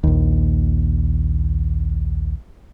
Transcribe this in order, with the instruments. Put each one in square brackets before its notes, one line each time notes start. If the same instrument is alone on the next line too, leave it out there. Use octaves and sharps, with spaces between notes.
[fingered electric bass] A#1 D#2